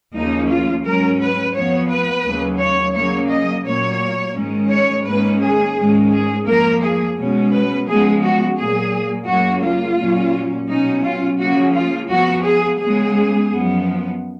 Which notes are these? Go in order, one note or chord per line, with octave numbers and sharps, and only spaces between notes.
D#2 C#3 F3 A#3 C#4 D#4
F4
G#2 F#3 C#4 A#4
B4
F2 F3 B3 C#5
B4
D#2 C#3 F#3
C#5
C#3 F#3 A#3 C#5
D#5
A#2 F#3 A#3 C#5
G#2 D#3 G#3 C#4
C#5
G#2 D#3 A#3 C#4 B4
G#4
G#2 D#3 G#3 C#4
G#4
F2 F3 A#3 A#4
G#4
B2 G#3 C#4
B4
C#3 F3 G#3 B3 G#4
F#4
A#2 F#3 A#3 G#4
F#2 C#3 F#3 A#3 F#4
F4
A#2 F#3 C#4
B2 F#3 C#4 D#4
F4
C#3 F3 A#3 C#4 F#4
F4
F2 F3 B3 F#4
G#4
C#3 G#3 B3 G#4
F#2 F3 B3